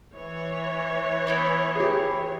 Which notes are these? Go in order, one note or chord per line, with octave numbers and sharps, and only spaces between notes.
E3 C#5
B3 D#4 E4
G4 G#4